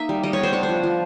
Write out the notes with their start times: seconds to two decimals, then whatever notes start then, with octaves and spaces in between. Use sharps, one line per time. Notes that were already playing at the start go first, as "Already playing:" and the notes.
Already playing: A#3 D#4 E5
0.09 G3
0.23 G3 D#5
0.33 C#5
0.39 B3 C5
0.53 D4 C#5
0.63 C5
0.69 F3
0.83 F3